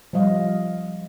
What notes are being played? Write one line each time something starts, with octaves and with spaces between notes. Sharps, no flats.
F3 G3 D#5 F5